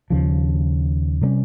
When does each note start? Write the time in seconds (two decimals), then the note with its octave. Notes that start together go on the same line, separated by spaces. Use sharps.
0.10 D#2 C#3 F3
1.21 C3 G3 A#3 C#4